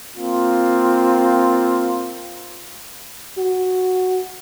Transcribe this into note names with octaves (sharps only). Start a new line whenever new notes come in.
A#3 C4 F4
F#4